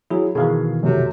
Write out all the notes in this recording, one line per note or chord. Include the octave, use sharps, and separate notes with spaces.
F#3 E4 G#4
B2 D#3 E3 G#4 F5
F#2 C3 F#3 A3